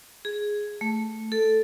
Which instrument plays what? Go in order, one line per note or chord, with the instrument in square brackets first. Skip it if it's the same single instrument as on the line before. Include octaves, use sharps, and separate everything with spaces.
[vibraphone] G#4
A3
A4